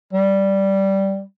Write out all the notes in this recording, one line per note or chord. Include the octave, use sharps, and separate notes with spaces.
G3